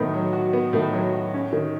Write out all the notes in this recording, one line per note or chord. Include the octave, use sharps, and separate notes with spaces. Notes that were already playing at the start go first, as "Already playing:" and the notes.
Already playing: A2 D#3 F#3 B3
F#3
F#4
B3
A2 D#3
F#3
F#4
C#4
D#3